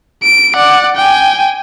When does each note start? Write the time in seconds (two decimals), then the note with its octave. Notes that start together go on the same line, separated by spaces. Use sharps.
0.23 D7
0.56 D5 F#5
0.96 G5 G#5